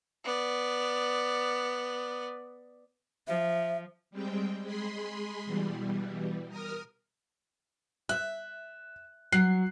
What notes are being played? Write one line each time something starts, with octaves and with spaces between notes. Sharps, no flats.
B3 D5
F3 E5
G3 G#3 C4 G5
G#3 G#4 B5 C6
B2 E3 G3
A#4 D#6 F6
E5 F#6
F#3 F#6 C7